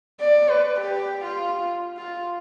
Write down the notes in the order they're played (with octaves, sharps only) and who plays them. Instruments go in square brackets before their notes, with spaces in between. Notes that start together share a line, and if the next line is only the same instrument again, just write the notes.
[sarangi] D5
B4
G4
F4
F4